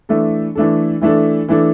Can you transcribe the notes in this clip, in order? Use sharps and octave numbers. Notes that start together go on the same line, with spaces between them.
E3 A3 D4 A4
E3 A3 D4 A4
E3 A3 D4 A4
E3 A3 D4 A4